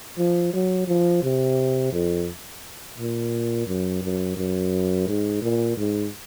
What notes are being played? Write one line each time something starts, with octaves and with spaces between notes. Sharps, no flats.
F3
F#3
F3
C3
F2
A#2
F#2
F#2
F#2
G#2
A#2
G#2